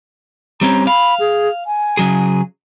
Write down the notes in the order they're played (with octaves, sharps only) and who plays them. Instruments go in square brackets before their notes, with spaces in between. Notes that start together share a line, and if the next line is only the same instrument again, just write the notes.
[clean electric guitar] G3 C4 C#4 [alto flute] A#5
[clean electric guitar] F5 [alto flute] B5
[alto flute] G#4
G#5
[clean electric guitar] C#3 F#3 G#4